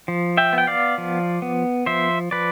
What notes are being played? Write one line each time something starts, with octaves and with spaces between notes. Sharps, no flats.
F3
E5 G5
B3
G5
D5 F5
F3
B3
F3 C5 E5
F3 B4 D5